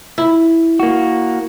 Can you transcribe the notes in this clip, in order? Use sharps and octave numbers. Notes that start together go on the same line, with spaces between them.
E4
A#3 F#4